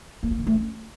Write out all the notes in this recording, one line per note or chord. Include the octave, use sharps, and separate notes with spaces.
A#3
E4
D3
A3
C#4